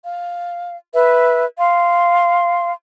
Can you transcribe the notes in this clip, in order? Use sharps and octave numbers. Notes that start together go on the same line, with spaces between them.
F5
B4 E5
F5 C6